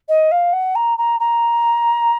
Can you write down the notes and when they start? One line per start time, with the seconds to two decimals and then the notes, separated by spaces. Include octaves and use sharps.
0.08 D#5
0.31 F5
0.52 F#5
0.75 A#5
0.98 A#5
1.19 A#5